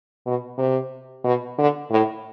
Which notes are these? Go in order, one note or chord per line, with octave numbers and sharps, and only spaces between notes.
B2
C3
B2
D3
A2